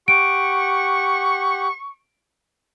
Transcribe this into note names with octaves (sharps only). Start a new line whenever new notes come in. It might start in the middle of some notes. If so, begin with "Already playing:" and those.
G4 F#5 C#6 D7